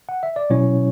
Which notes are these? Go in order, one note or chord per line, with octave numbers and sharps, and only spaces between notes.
F#5
E5
D5
B2 F#3 C#4 E4 C#5